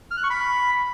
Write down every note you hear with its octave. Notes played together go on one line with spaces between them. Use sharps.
F6
F#6
C#6
B5